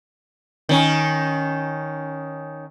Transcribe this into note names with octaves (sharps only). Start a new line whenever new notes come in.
D#3 C#4